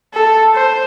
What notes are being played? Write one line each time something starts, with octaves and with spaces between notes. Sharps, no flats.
A4
C5